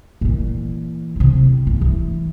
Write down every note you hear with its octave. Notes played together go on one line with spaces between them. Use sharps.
A#2 E3
E2 C3
E3
E3